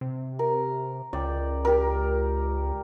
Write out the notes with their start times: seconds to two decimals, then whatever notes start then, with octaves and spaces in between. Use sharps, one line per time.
0.01 C3
0.39 A#4
1.13 C#2 D5 G5
1.65 G4 A#4